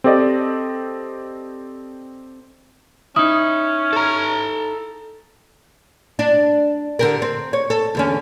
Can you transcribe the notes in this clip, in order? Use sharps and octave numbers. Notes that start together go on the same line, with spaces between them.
C4 G4 A4 D5 D#5
C#4 D#4 E4 D#6
A4 A#5
D4
D3 G4 A#4
C4
C#5
A4
E2 D3 C#4